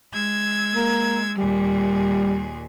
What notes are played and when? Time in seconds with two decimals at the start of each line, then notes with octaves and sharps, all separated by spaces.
0.11 G#3 E6 G#6
0.75 A#3
1.38 D#2 A#2 G3 G#4